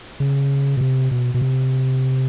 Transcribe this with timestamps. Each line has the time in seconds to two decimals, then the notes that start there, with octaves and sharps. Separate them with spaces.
0.20 C#3
0.77 B2
0.81 C3
1.11 B2
1.34 B2
1.41 C3